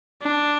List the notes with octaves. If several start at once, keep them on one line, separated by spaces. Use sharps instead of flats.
D4